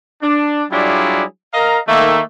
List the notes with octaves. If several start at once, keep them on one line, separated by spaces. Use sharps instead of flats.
D4
F#3 G3 D4 E4 F4 G#4
A#4 D#5 F5 A#5
D#3 A3 A#3